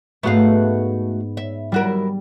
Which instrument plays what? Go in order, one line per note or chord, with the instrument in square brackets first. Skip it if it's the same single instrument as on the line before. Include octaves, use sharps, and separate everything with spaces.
[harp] G#2 B3 [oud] A3 F#4 F5
[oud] E5
[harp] G3 [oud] E4 F#4 A#4